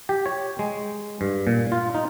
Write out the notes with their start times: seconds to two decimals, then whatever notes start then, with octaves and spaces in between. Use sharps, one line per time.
0.09 G4
0.26 C#5
0.59 G#3
1.21 G2
1.47 A#2
1.72 F4
1.95 D#4